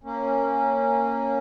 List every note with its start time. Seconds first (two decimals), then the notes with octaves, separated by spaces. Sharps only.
0.04 A#3 C#4